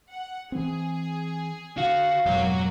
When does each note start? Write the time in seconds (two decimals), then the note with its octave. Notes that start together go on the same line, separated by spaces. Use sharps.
0.10 F#5
0.52 E3 C4 G#4
1.77 D3 F#4 F5
2.26 F2 G#2 B2 F#3 A#3 F#4 C#5